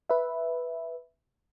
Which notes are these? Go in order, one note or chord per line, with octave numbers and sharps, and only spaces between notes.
B4 E5